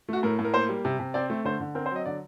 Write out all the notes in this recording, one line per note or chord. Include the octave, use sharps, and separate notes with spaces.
A3 F#4
A2 A#4
A2
A#4
A#3 C5
G3
C3
C3
C4 D5
A3
D3 C5
D3
C4 A#4
C5
F#3 D#5
D3 D5